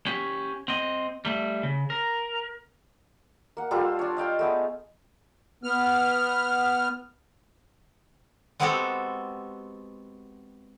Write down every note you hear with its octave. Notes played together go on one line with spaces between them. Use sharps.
C#4 G4
C4 D#5
G3 A3
C#3
A#4
A#3 F#5
G3 F4 A4 C5
D4 C#5
D#5 F5 G5 C6
A3 B3 G#4
B3 F6
G#3 B3 C4 F#4 G4 A4